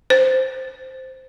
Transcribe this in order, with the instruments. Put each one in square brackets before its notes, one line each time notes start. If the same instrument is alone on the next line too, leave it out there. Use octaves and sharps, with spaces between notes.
[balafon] C5